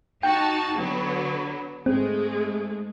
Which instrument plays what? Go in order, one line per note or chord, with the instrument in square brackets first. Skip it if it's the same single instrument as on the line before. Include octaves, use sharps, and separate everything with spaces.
[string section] D#4 F#4 A5 [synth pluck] G5
[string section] D3 F#3 B3
[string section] G#2 G#3 A3 [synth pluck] C4